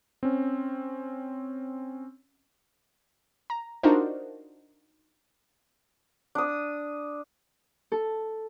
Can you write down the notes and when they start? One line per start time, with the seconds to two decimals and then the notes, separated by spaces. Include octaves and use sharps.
0.23 C4 C#4
3.50 A#5
3.83 D4 D#4 F4 F#4 A#4 C5
6.35 D4 D#6
7.92 A4